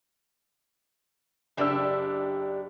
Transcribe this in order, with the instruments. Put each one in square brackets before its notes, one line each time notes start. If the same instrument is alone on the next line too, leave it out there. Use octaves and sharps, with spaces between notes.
[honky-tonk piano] F#1 D4 E6 [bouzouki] G4 E5